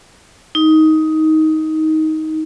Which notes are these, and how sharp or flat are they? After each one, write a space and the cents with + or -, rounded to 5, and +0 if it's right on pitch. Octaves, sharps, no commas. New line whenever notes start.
D#4 +15